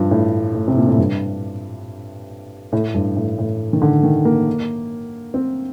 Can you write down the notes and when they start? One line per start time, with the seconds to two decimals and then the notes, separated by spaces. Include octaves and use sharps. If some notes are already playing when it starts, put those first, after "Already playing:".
Already playing: G2 F3
0.11 A2
0.54 A2
0.68 C3
0.78 A#2
0.87 A2
0.98 G2
2.72 A2
2.94 G2
3.16 A2
3.38 A2
3.73 D#3
3.82 D3
4.03 D#3
4.25 A#3
5.34 C4